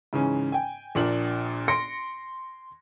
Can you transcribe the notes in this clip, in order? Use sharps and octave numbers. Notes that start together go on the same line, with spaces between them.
G#2 C#3 E3 C#4
G5 G#5
A#1 A#2 D4 F#7
C6 A#6 C#7 D7